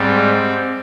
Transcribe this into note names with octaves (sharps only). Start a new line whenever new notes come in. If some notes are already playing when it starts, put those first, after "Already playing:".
Already playing: G#2 G3 C4